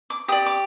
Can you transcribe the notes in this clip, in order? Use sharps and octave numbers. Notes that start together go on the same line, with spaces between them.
D6
G4 D5 D#6
D6